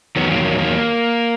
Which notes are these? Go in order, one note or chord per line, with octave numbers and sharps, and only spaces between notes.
E2 D#3 F#3 B3
A#3
A#3
A#3